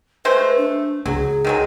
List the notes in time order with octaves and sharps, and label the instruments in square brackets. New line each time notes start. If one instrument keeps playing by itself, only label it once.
[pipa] G#3 A3 C5 [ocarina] B4
[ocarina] D4
[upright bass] C#2 [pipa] F#3 [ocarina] G#4
[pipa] D#3 F#3 G#3